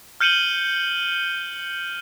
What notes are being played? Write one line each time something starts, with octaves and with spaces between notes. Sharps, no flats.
F6 G6 C#7 D#7 F#7 G7